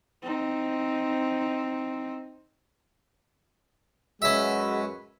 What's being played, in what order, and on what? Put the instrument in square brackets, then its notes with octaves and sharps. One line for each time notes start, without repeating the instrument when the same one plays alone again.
[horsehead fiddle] C4 D#4
[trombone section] F#2 F#4 B4 [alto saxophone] G#3 [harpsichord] C#4 E5